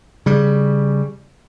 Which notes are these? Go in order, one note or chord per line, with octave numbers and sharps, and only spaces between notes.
C#3 G3